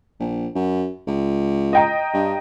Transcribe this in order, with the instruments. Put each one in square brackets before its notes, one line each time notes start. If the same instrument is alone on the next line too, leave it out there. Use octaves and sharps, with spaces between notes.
[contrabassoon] A#1
F#2
C#2
[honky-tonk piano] D#5 G5 A#5
[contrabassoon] G2